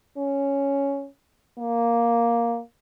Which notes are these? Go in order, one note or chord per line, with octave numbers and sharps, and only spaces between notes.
C#4
A#3